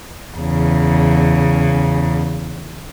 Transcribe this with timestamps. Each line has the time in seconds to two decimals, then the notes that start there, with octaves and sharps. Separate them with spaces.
0.37 E2 C#3